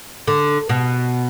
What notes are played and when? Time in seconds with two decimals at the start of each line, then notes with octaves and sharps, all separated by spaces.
0.27 D3
0.69 B2